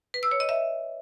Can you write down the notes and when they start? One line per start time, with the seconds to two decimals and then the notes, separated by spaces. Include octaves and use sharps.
0.14 B4
0.23 E6
0.31 C#5
0.40 D#5
0.49 E5